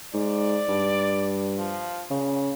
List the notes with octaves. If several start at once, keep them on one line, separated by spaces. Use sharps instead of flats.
G#2 D5
G2
F3
A#2 C#3